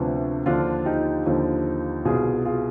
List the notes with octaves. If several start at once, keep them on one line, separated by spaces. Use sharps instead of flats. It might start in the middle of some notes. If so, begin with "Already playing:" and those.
Already playing: D2 C3 F3 B3 D4
D#2 D3 F3 D4 F4
D#4 G4
D#2 D3 F3
C2 B2 F4 G#4
F4 G#4